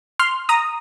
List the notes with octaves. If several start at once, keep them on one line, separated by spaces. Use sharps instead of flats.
C6 F6
A#5 D#6